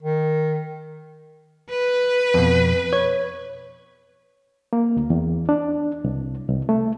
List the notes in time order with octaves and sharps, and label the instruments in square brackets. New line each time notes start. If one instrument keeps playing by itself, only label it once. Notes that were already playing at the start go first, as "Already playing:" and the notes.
[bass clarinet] D#3
[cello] B4
[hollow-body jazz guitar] F2 B2
C#5
[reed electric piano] A#3
D2
E2
D4
C2
C2
A3